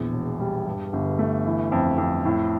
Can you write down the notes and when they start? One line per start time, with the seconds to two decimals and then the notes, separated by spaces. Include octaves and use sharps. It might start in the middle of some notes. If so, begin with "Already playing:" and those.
Already playing: A#1 E2
0.13 E1
0.40 G3
0.66 G2
0.93 G1
1.19 A3
1.46 E3
1.72 F2
1.98 F2
2.25 A2